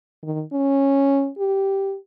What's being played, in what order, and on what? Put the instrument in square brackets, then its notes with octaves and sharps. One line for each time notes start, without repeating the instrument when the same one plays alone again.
[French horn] D#3
C#4
G4